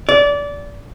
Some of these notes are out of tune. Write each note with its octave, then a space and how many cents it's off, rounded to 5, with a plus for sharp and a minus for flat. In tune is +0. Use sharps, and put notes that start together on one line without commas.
D5 -25